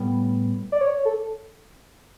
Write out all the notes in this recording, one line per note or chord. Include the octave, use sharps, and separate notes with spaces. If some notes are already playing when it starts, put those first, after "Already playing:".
Already playing: A2 G3 B3
D5
C#5
A4